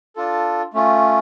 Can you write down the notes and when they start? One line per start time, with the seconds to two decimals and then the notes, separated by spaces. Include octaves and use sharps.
0.16 D4 F4 A4
0.74 A3 C#4 F4